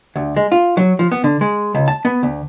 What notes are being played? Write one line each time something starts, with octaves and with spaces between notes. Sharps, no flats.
D2
G#3
F4
F#3
F3
B3
D3
G#3
C#2
A5
B3
D2